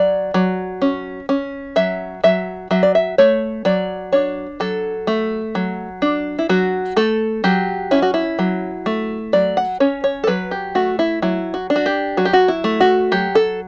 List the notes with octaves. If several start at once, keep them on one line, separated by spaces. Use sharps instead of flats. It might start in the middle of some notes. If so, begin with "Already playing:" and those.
Already playing: F#3 D5
F#3
C#4
C#4
F#3 E5
F#3 E5
F#3 E5
D5
E5
A3 C#5
F#3 D5
D4 C#5
F#3 A4
A3
F#3
D4
E4
F#3 F#4
A3 A4
F#3 G4
C#4 E4
F#4
E4
F#3
A3
F#3 D5
F#5
C#4 C#5
C#5
A4
F#3 B4
G4
A3 F#4
E4
F#3 E4
F#4
D4
F#4
G4
F#3 F#4
G4
F#4
E4
A3
F#4
F#3 G4
A4